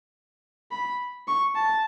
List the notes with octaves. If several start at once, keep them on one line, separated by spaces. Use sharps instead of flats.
B5
C#6
A5